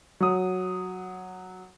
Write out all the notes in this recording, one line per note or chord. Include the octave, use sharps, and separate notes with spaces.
F#3 D#6